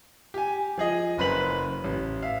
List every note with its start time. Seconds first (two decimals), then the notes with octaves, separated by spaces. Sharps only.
0.34 G4 G#5
0.78 F3 G#4 D#5
1.18 F#1 F#2 B4 C5 B6 F#7
1.84 A1
2.22 E5 F5